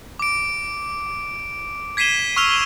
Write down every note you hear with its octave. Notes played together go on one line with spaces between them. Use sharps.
D6 D7
G#6 B6 C7 D#7 E7 G7
C#6 E6 F6 F7 G7